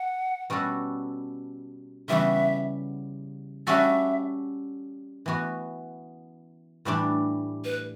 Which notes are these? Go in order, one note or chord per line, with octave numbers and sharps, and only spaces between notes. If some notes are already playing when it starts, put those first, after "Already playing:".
Already playing: F#5
B2 G3 C#4 F#4 A4
C#3 E3 G3 B3 F#4 E5
G3 C#4 F#4 A4 E5
E3 B3 F#4
A2 E3 G3 D4 G4
B4